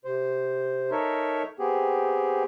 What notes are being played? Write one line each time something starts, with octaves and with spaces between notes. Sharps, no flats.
C3 C5
D#4 A4 A#4 C#5 E5
B3 C4 G4 G#4